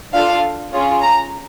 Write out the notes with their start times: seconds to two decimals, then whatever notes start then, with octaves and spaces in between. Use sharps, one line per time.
0.13 D4 F4 A4 F5
0.72 C#4 F4 G#4
1.02 A#5